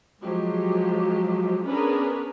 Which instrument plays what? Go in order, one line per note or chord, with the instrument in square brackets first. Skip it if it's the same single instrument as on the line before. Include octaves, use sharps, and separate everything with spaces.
[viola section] F3 F#3 G#3 G4
B3 C#4 D4 G#4 A#4 B4